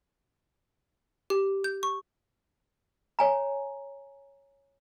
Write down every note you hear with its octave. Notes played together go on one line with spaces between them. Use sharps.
G4
G6
C#6
C#5 G#5 A#5